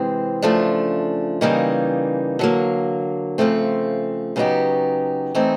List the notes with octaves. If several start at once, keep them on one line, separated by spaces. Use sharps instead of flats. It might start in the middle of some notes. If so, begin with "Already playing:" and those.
Already playing: C3 E3 G#3 C4
C#3 F3 A3 D4
C#3 E3 G3 A#3 D#4
D3 F#3 A#3
C#3 F3 A3 C4
C#3 F#3 B3 D#4 G4
E3 A3 C4 D#4